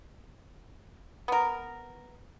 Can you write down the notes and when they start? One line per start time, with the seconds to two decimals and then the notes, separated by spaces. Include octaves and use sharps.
1.28 B3 A#4